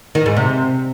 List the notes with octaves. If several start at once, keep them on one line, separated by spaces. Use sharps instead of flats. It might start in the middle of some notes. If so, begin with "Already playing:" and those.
D#3
G#2
C3